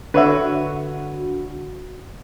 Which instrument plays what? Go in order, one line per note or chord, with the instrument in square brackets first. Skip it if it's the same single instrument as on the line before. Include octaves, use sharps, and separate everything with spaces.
[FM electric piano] D3 F#4 [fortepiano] B4 C#5 E5